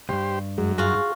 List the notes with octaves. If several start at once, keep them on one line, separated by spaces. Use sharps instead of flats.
C2 G2 G4 C5
F#2 G#3
F4 F#4 G#4